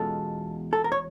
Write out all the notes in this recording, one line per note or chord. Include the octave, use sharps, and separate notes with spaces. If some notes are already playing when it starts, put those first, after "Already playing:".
Already playing: E2 B2 G#3 C#4 F4 A4
A4
A#4
C#5